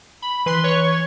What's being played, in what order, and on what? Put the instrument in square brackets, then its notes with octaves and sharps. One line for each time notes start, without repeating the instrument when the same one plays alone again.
[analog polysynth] B5
[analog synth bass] E3 [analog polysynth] B4 C6
[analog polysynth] C#5 C#6